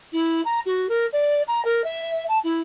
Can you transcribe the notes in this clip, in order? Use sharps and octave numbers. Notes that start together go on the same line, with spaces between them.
E4
A#5
F#4
A#4
D5
A#5
A#4
E5
A5
E4